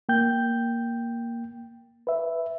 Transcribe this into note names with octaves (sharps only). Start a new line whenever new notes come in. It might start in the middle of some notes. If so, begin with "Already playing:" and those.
A#3 G5 G6
B4 E5